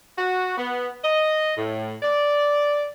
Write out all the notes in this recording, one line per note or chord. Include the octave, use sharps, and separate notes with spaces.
F#4
B3
D#5
A2
D5